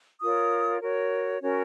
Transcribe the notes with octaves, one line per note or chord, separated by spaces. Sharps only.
F4 A#4 C#5 D#6
F#4 A#4 C#5
C#4 F#4 A#4 C#5